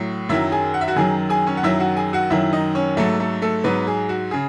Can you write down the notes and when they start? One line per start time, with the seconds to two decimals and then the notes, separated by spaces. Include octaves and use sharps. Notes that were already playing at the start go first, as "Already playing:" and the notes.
Already playing: A2 F#3
0.29 F#2 D#3 F#3 E4 E5
0.52 G#4 G#5
0.74 F#5
0.81 E5
0.88 F#4 F#5
0.96 F#2 D#3 F#3 G#4 G#5
1.30 G#4 G#5
1.47 C#4 C#5
1.57 F#5
1.63 F#2 D#3 F#3 E4 E5
1.80 F#4 F#5
1.97 G#4 G#5
2.13 F#4 F#5
2.30 F#2 D#3 F#3 E4 E5
2.53 D#4 D#5
2.75 C#4 C#5
2.97 G#2 F#3 A3 A4
3.20 A3 A4
3.42 A3 A4
3.64 G#2 F#3 B3 B4
3.87 G#4
4.09 F#4
4.31 C#3 G#4